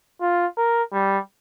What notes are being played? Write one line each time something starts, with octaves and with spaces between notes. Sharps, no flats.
F4
A#4
G3